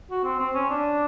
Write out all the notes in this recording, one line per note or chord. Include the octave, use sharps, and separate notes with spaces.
F#4
C4
C4
C#4
D4